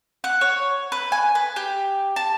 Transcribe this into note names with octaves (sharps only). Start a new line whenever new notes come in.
F#5
C#5
B4
G#5
B4
G4
A5